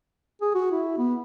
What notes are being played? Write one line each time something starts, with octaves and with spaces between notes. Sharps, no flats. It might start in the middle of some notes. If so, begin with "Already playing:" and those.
G#4
F#4
E4
B3